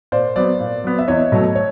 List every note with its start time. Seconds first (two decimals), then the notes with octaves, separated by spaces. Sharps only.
0.12 A#2 C5 D5
0.36 F#3 B3 C5 D5
0.60 A#2
0.84 F#3 B3
0.99 E5
1.08 E2 C#5 D#5
1.32 B2 F#3 A3
1.55 C#5